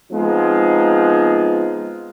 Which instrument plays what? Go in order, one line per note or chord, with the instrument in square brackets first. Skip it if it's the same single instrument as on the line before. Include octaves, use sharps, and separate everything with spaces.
[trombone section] F3 G#3 B3 C4 D#4 F4